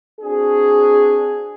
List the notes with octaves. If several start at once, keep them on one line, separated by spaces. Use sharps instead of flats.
C4 D4 F#4 G#4